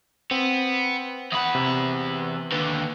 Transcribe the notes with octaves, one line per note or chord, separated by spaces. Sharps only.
B3 C4
E2 B4 F#5 D#6
C3
D#2 D3 B4